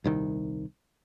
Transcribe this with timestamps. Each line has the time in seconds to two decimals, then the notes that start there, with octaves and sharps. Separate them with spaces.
0.04 D#1 C2 D#3